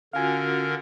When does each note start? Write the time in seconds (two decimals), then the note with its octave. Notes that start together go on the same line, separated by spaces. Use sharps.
0.13 D3 C#4 F4 F#4 A#4 F5 G#5